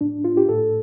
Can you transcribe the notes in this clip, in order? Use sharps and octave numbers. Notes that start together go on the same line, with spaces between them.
A2 D4
A2 F4
G4
A2 A4